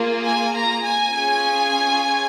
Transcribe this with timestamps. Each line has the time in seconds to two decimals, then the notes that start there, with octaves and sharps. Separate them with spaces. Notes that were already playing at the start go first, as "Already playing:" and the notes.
Already playing: A#3 F4 G#4
0.25 G#5
0.54 A#5
0.83 G#5
1.11 C#4 F4 G#4